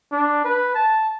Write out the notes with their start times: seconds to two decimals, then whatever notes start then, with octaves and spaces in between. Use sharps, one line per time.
0.12 D4
0.44 B4
0.75 A5